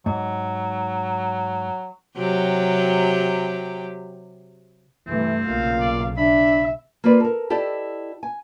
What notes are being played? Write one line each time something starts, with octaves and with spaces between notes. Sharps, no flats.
G#2 F#3
C3 F#3 G4
G2 C3 E3 A3 C4
B1 A#2 C#3 F5
D5
D4 E5 B5
A#3 C4 F4 B4 D5
A4 A#4
E4 G4 A4 D5 D#5
G#5